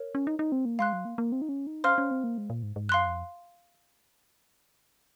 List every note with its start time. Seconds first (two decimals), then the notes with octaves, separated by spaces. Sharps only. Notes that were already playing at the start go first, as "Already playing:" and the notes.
Already playing: A#4 C#5
0.15 C#4
0.27 D#4
0.39 D#4
0.52 C4
0.65 A#3
0.79 G#3 F5 C6 F#6
0.93 F#3
1.05 A#3
1.18 A#3
1.32 C4
1.42 D#4
1.49 C#4
1.67 D#4
1.84 C#4 C5 F5 C6 F6
1.98 C#4
2.11 C4
2.24 A#3
2.38 G#3
2.50 A#2
2.63 G#2
2.76 G#2
2.89 F#2 F5 C6 F#6
3.07 F2